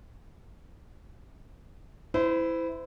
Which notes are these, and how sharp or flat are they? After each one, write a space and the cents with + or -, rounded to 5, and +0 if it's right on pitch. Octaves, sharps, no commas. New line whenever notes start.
E4 +0 C5 -35